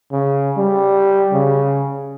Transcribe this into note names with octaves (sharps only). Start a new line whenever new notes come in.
C#3
G3
C#3